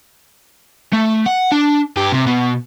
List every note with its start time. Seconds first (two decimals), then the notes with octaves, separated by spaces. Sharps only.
0.93 A3
1.26 F#5
1.52 D4
1.97 G2 G4
2.12 C3
2.27 B2